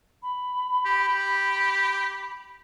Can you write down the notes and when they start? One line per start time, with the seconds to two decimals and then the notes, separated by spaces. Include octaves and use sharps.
0.22 B5
0.85 G4
1.08 G4